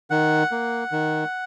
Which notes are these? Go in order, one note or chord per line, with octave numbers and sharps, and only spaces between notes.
D#3 F#5
A#3
D#3